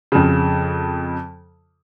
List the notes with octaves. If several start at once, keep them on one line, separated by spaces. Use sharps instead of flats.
F2 C#3